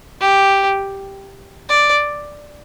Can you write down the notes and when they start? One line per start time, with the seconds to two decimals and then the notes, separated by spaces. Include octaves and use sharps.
0.21 G4
1.70 D5